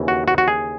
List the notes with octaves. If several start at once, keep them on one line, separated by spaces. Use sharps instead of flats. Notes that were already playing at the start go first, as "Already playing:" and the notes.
Already playing: D#2 C#3 E3
F#4
F#4
F#4
G#4